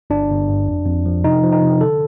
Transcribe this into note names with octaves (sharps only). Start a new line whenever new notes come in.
G1 D4
G1
G2
F2
F2
F3
C3 D#4
F3
D#4
C3
D3 A4